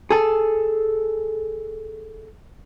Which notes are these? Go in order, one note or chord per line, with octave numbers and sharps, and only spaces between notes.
G#4 A4